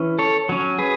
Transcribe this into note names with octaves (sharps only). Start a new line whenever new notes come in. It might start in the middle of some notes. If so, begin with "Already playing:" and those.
Already playing: E3 C#4
A4 C#5
F#3 C#4
G#4 B4